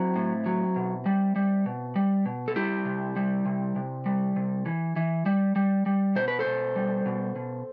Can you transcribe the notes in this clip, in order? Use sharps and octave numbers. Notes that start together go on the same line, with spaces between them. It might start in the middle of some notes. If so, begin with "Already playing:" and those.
Already playing: F#3 C4 E4
A2
F#3
B2
G3
G3
B2
G3
B2
A4
G3 E4 G4
C3
G3
C3
C3
G3
C3
E3
E3
G3
G3
G3
B2 C5
B4
A4 C5
B2
G3
B2
B2